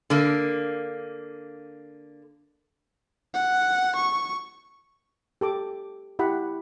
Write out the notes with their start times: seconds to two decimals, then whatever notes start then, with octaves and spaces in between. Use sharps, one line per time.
0.10 D3 A#3
3.34 F#5
3.96 C#6
5.41 G4 A4 D6
6.19 E4 G4 F#5 B5